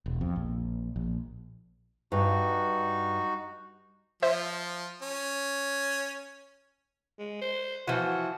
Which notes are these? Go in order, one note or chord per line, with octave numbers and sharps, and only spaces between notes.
E1
F2
A#1
A#1
G2 D#4 F#4
F3 C5 E5
C#4
G#3
C5
E3 F3 F#4